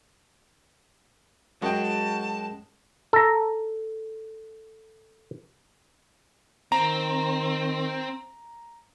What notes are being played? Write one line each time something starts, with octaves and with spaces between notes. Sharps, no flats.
F#2 G#3 F#4 G5 A5
A4 A#5
D#3 C4 A#5